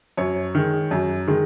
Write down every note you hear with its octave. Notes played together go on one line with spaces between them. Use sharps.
F#2 C#5
D#3 G#3
F#2
D#3 G#3